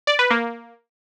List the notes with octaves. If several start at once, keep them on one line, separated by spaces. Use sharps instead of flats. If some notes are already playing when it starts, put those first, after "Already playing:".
D5
B4
A#3